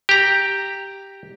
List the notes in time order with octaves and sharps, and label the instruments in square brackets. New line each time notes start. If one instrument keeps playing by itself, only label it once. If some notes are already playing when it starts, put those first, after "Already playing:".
[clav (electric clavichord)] G4 A#5